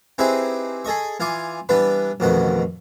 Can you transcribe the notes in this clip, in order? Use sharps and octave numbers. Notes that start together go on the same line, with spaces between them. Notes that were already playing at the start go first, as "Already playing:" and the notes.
C4 D#4 E4 G4 G#4 B4
G#4 A4 D#5 C#6
E3 F4 G#5 D6
E3 G3 B3 D4 B4
A1 F2 B2 D#3 F#5